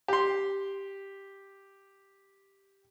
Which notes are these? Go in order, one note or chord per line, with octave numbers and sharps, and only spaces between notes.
G4 C6